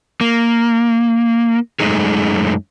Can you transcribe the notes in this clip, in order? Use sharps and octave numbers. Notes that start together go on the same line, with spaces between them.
A#3
F#2 C#3 G#3 A3 D#4 G#4